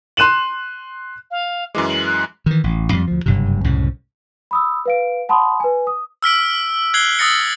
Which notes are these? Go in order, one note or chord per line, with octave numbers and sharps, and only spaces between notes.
C6 F#6 D#7 E7 F#7
F5
F#2 E3 G#3 D6
F#7
F#6
D#3 E3
A1
F2 F#3 G3
D2 F3
F#1 G2 C3
C2 F#2 A2 C#3
B5 D#6 E6
B4 F5 D7
F#5 A5 B5 C6 D#6
B4 G#5
D#6
E6 F6 B6 D7
F#6 G#6 C7 F#7 G7
D#6 E6 A6 A#6 C#7